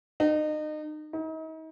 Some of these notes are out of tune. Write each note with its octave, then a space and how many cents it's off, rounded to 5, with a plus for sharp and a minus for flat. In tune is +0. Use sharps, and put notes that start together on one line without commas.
D#4 -30
D#4 +40